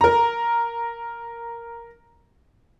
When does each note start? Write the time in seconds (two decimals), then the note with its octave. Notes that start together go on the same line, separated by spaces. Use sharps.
0.01 A#4 A#5